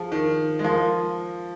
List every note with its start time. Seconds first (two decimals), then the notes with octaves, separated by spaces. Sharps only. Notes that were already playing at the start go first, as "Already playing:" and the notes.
Already playing: F3 G#4
0.12 D#3
0.59 G#3
0.64 F3 A#4 F5 C6